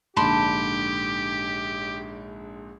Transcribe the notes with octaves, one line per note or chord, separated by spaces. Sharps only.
A#1 G#2 D3 G4 A5 B5 C6